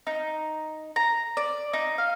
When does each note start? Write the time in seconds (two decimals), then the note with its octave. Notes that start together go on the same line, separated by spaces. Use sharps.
0.07 D#4
0.96 A#5
1.37 D5
1.73 D#4
1.98 F5